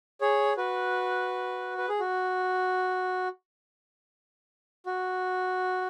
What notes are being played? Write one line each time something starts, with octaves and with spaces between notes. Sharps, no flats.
G#4 C#5
F#4 B4
B4
G#4
F#4
F#4